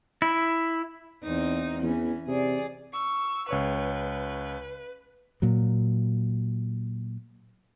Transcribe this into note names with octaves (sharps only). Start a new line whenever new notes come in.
E4
E2 C4 D#4
E2 E3 C#4
C3 G#4 D5
C#6 E6
C#2 B4 C#5 C#6
A#2 F#3